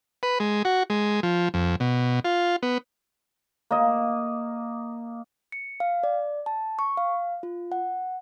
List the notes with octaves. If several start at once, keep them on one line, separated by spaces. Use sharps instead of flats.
B4
G#3
F#4
G#3
F3
F2
B2
F4
B3
A#3 D#5
C#7
F5
D5
A5
C#6
F5
F4
F#5